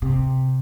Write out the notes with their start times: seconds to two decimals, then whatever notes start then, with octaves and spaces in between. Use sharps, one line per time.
0.02 C3